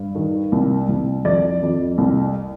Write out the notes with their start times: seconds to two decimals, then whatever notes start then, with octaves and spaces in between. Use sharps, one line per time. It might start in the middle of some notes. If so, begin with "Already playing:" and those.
Already playing: G2
0.15 D#3
0.52 C2
0.89 C2
1.25 F2 D5
1.62 F2
1.98 C2